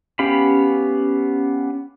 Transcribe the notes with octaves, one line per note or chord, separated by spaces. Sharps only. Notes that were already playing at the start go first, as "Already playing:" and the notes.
B3 C#4 G4 F5 B5